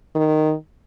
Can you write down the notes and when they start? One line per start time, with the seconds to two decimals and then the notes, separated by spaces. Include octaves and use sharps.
0.15 D#3